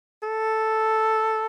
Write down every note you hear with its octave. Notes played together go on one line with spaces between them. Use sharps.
A4